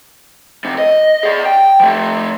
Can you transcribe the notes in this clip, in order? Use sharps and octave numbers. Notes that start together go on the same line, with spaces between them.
F2 C3
D#5
G#4 D5
G5
F3 A3